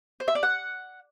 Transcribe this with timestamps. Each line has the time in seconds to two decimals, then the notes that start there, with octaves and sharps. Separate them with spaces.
0.20 C5
0.28 E5
0.35 D5
0.43 F#5